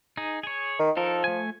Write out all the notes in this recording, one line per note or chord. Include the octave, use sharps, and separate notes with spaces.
D#4 G#4
G#4 C#5
D#3
F3 D#4 A4 A#4
A3 G#5